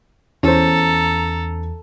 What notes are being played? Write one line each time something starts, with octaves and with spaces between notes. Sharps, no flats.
E2 C#4 A4 C5 A#5